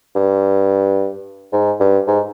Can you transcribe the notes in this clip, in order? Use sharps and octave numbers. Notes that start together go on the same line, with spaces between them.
G2
G#2
G2
G#2